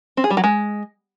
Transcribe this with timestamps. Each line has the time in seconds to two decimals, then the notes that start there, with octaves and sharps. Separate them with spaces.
0.17 C4
0.24 G#4
0.30 G3
0.37 F#3
0.44 G#3